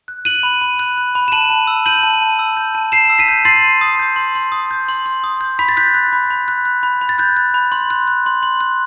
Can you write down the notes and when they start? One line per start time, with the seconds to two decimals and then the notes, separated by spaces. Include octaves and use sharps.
0.08 F#6
0.25 F#6 D#7 F#7
0.43 B5
0.61 B5
0.79 F#6
0.98 F#6
1.15 B5
1.28 E7
1.32 A5 D#7 F#7
1.50 A5
1.67 E6
1.86 G6 D#7 F#7
2.03 A5
2.22 A5
2.39 E6
2.57 G6
2.75 A5
2.92 A5 C7 E7
3.10 E6
3.19 B6 D#7
3.28 G6
3.45 C6 A6 C7
3.64 C6
3.81 D#6
3.99 G6
4.16 C6
4.35 C6
4.52 D#6
4.71 G6
4.89 C6
5.06 C6
5.24 D#6
5.41 G6
5.59 B5 B6
5.69 A6
5.77 F#6 G6 B6
5.94 F#6
6.13 B5
6.30 B5
6.48 F#6
6.65 F#6
6.83 B5
7.01 B5
7.09 A6
7.18 F#6 G6
7.37 F#6
7.54 B5
7.72 C6
7.90 F#6
8.07 F#6
8.26 C6
8.43 C6
8.61 F#6